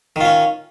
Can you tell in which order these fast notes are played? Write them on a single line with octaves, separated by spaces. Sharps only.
D#3 F4 C#4